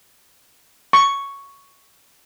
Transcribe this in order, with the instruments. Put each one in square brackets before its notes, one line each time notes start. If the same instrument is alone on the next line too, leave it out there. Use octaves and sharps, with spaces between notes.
[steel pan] C#6